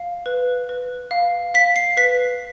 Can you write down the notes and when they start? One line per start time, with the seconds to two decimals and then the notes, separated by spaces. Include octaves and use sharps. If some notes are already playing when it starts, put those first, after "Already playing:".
Already playing: F5
0.26 B4
0.69 B4
1.11 F5
1.54 F5 B6
1.76 C7
1.97 B4 B6